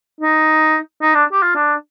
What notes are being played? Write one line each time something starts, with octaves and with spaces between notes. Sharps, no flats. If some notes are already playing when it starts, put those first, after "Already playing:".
D#4
D#4
D4
G4
F4
D4